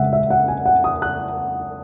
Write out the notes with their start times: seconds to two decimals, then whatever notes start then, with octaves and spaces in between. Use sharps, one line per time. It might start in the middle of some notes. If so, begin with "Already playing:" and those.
Already playing: C#3 G#3 E5 F#5
0.13 E5
0.30 F#5
0.48 G#5
0.66 F#5
0.84 D#6
1.02 F#6